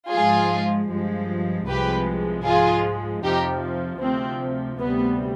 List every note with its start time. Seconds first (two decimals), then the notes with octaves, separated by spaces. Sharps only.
0.11 G#2 F3 G#3 F4 G#4
0.90 G2 F3 G#3
1.67 C2 C3 F3 G#3 G4 B4
2.46 G#2 F3 G#3 F4 G#4
3.23 F2 C3 F3 D#4 G4
4.01 D2 C3 F3 C4
4.79 D2 C3 G3 B3